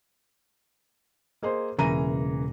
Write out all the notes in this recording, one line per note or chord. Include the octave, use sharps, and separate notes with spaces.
A#3 G#4 C5 D#5 C6
E1 C#3 E3 A#3 A#5 A#6 D#7